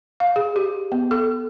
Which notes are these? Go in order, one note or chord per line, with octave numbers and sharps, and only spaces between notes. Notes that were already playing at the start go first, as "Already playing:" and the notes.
F5
G#4
G4
B3
A4